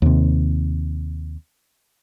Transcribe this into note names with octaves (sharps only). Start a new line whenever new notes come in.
D#2 C3